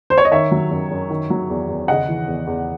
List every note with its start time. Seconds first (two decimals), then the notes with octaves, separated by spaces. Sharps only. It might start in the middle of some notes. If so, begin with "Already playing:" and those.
0.10 C5
0.18 C#5
0.25 D#5
0.32 D#3 C#5 E5
0.51 F#3
0.71 F#2
0.91 F#2
1.10 D#3
1.30 F#3
1.50 E2
1.69 E2
1.88 C#3 D#5 F#5
2.08 E3
2.27 E2
2.47 E2